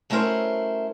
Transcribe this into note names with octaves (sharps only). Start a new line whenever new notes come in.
F#3 A3 C#4 E4 A#4 C5